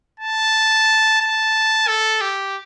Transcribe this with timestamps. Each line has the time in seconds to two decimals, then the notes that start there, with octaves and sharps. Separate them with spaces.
0.20 A5
1.21 A5
1.88 A4
2.21 G4